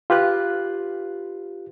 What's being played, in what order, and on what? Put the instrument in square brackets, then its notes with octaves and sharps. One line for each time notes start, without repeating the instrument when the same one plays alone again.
[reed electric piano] F4 G4 B4 F#6